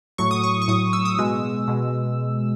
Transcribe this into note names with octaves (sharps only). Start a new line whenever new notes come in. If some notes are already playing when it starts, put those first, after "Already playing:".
A2 F#3 C#6
D#6
C#6
C#6
A2 F#3 D#6
E6
D#6
B2 G#3 E6
B2 G#3